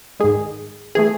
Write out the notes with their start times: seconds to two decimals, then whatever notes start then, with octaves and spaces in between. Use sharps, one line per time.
0.20 G#2 D#3 G#3 G#4
0.95 E3 A3 G#4